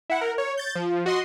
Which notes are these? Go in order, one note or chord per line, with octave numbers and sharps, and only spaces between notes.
E4 F#5
A#4
C#5
G6 A6
F3
F#4 D#5 C6